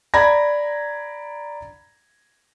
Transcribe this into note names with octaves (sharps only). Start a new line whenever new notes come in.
D5 A#5 B5 G#6 A#6